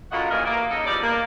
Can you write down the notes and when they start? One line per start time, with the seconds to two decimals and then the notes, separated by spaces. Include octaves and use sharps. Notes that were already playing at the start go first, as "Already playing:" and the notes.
0.11 F#2 A2 F4 F#4 D#5 F#5
0.30 D#2 A#2 E3 G#4 A#4 D#5
0.45 A#3
0.70 C#3 D#4 A4 D#5
0.86 E2 F3 G3 D5
1.02 A#3